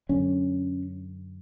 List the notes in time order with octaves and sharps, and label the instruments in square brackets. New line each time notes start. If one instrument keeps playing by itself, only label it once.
[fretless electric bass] F#2 D3 C#4